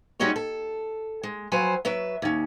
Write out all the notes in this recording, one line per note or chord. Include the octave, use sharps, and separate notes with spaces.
G3 G#3 C#4 D#4 F#4 C#5
A4
G#3
F3 F#3 B4 C5 G#5
F#3 B4 E5
D#2 C#4